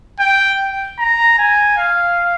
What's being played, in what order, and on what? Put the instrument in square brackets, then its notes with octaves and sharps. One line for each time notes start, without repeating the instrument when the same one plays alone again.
[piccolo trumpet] G5
A#5
G#5
F5